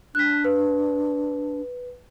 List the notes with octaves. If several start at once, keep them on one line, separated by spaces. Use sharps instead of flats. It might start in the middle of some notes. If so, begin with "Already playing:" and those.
D4 F#6 B6
B4